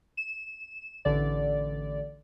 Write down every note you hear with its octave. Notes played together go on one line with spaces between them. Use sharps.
E7
A1 D3 D5